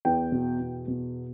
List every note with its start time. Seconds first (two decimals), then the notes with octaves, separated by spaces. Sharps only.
0.05 E2 G5
0.32 B2
0.59 E2
0.88 B2